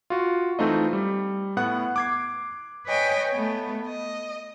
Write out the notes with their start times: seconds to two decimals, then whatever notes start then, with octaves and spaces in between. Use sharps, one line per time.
0.10 F4 F#4
0.59 E3 A3 C4 D#4 F4 D#5
0.93 G3
1.57 A2 B3 F#5 F#6
1.96 D6 G#6 C7
2.85 B4 C#5 D#5 G5 G#5
3.31 A3 B3
3.88 D#5